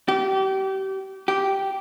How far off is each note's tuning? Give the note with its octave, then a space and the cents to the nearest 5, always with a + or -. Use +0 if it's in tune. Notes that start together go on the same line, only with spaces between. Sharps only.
G4 -30
G4 -10